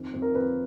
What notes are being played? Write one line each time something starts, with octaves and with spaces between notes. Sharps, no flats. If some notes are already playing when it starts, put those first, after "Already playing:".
Already playing: F2 D#3
F2
A#4
F2 B4